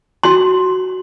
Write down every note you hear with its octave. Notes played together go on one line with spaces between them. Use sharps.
F#4 C6